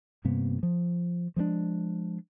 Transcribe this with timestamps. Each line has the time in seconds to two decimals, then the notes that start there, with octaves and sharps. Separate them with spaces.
0.25 G2 C3 A#3 B3
0.63 F3
1.36 F3 G#3 A3 D4